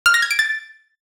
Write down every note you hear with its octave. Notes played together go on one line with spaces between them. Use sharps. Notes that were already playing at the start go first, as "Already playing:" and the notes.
F6
A#6
G#6
D7
A6